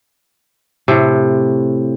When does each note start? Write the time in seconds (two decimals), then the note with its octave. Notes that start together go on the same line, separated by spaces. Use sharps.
0.88 A2 C3